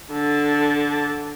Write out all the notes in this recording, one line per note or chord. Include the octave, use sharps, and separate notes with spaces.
D3 A5